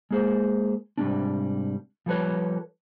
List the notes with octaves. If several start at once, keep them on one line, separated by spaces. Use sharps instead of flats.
G#3 A#3 G#4 C5
G#2 C3 G3 A#3 C#4 D4
F3 G3 G#4 A4 B4 C#5